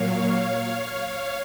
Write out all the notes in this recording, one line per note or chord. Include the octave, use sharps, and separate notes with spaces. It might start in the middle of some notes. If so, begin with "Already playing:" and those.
Already playing: A#2 F#3 A#3 C#5 F5